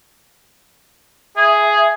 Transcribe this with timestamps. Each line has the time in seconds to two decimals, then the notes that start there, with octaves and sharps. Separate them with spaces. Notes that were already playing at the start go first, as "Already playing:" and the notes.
1.37 G#4 E5